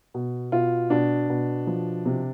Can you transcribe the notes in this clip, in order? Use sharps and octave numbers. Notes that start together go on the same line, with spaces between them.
B2
B2 F4
B2 D4
B2
F3
C3